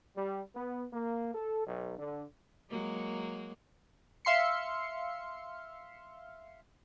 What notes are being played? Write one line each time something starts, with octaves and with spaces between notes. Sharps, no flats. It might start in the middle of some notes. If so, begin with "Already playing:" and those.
G3
B3
A#3
A4
B1
D3
F#3 G#3 A#3
E5 F5 C6 C7 C#7